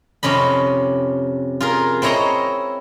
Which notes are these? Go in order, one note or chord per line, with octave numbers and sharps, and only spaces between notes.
F2 C3 C#4 D#5 B5
F4 G#4 A#4
C4 E4 C#5 D#5 A#5 C6